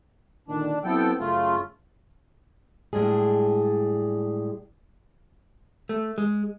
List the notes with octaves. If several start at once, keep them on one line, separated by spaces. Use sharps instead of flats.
A#2 D3 D#3 D4
F#3 B3 C4 E4 A4 G5
F#2 C#3 A3 F4
A2 G3 G#3 D4 G#4
A3
G#3